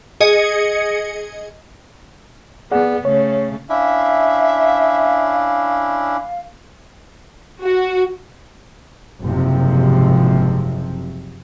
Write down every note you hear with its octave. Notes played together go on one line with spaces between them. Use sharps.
G#4 D#5 C#7
B3 G#4 D5 F#5
C#3 A3 C#5
C#4 D4 E4 E5 F5
F#4
F#1 G#2 C3 F3